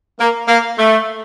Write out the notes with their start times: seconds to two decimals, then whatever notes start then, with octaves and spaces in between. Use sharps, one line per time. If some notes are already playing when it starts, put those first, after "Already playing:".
0.19 A#3
0.48 A#3
0.78 A3